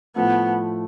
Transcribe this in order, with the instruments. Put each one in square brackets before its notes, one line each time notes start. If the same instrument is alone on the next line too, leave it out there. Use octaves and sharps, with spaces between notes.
[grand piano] A2 F3 A3 [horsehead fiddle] B3